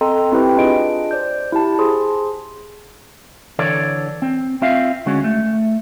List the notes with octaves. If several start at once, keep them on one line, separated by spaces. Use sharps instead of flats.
C4 A4 D#5 G5 A#5 C6
C4 E4 G4 B4 G5
D4 F4 G#4 D#5 D7
C5 D5 G6
E4 G4 A5
G#4 C5 C6
D3 E3 A4 C#5 D5
C4
C4 F4 E5 F5
D3 G#3 C#4 F#4
A3